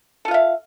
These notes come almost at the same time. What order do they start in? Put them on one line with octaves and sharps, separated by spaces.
A4 F4 F5 E5